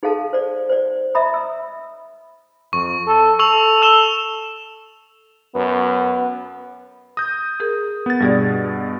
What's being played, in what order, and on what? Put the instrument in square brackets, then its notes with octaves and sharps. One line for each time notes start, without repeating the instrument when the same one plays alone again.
[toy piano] D#4 G#4 A4 F5 A5
C5 D5
C5 D5
D#5 E5 A#5 B5 D#6
E6
[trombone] F2 [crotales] C#6
[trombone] A4
[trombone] A4 [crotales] C#6 E6 F7
[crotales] E6 E7 G7
[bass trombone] F#2 [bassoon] B3
[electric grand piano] D#6 G6 [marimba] A#6
[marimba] G#4 A#4
[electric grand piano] B3 A6
[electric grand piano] G2 B2 [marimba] G3 G#4 D5